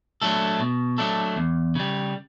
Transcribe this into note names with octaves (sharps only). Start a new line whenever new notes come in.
F#3 A3 D4 A4
B2
F#3 A3 D4 A4
E2
C#3 G3